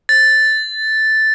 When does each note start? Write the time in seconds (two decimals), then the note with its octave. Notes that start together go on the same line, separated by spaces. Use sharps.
0.09 A6